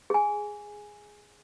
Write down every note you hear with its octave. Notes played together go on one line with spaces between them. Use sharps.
G#4 G#5